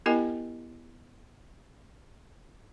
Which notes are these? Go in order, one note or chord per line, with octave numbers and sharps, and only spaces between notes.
B3 E4 G4 A#4 D#5 G#5